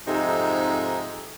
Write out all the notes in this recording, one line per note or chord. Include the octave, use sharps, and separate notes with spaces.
F2 G#2 C3 D#4 A4 E5